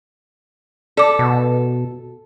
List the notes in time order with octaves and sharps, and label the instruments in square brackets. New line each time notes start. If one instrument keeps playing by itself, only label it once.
[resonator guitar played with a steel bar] A4 [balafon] D5 D6
[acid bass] B2